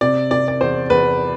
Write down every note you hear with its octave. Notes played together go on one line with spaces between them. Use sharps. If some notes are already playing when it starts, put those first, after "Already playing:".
C3 D5
C3 D5
D5
E2 C5
E2 B4